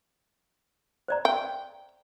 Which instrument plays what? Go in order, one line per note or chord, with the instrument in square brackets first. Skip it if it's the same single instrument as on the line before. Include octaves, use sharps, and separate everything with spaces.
[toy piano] C5 D5 A#5
[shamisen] G5